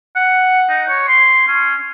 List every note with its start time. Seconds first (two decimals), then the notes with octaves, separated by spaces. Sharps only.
0.16 F#5
0.69 D#4
0.89 C#5
1.08 C6
1.47 C#4